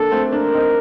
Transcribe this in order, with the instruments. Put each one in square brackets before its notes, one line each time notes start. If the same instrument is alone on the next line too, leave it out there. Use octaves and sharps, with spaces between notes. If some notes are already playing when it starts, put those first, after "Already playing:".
Already playing: [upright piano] A#3 D4 [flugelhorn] A4
[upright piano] A3 C4
[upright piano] A#3 D4 [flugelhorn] A#4
[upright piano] C4 D#4